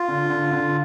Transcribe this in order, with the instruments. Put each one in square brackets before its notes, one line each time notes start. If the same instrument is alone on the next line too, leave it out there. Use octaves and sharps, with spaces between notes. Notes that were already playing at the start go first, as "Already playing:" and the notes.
Already playing: [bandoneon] F4
[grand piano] D3
D3
D3